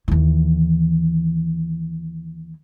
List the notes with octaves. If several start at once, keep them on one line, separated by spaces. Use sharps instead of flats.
D#2 E3